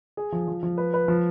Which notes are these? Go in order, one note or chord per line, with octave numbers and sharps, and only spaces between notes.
G#4
F3
F3
F3
B4
B4
F3